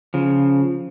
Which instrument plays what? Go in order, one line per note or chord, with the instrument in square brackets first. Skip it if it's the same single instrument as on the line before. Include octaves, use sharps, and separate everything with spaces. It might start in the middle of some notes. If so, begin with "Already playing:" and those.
[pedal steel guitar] C#3 F3